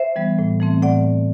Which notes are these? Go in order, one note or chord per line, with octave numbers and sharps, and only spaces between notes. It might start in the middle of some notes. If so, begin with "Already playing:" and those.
Already playing: C5 E5
E3 G3 B3
A2
E3 A3 C4
A2 D5 F#5